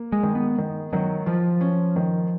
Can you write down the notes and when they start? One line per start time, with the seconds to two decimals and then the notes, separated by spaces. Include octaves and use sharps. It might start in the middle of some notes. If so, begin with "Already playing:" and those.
Already playing: A#3
0.12 G#3
0.23 D#3
0.35 B3
0.58 D#3
0.93 D#3 F#3
1.26 F3 F4
1.61 C#4
1.96 D#3